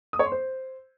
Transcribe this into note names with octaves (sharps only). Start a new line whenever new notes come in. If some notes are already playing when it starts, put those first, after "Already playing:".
D#6
C#5
C6
C5